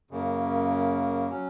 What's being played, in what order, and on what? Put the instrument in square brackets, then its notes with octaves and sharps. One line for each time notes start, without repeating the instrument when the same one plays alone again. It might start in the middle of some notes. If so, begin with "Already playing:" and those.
[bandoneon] F#2 C#3 A#3
F#3 C#4